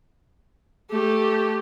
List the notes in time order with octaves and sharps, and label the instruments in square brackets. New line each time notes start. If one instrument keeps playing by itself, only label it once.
[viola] A3 G4